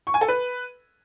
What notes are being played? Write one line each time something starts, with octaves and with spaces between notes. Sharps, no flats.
C#6
G#5
A4
B4